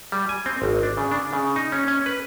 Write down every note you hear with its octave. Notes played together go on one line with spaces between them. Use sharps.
G3
G#5
C4
G#1
D4
C#3
D4
C#3
D#4
C#4
C#4
B4